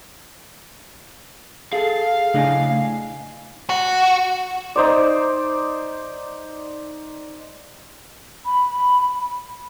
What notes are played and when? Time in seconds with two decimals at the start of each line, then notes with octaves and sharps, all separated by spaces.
1.73 G#4 A4 F5
2.34 A2 C#3 D4 D#5 G#5
3.70 F#4
4.76 D#4 C5 D5
8.45 B5